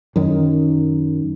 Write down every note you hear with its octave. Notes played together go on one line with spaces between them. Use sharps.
F#2 D#3